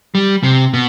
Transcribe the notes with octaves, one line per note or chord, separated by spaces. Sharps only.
G3
C3
B2